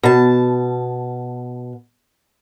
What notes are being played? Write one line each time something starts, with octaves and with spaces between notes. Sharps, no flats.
B2 A5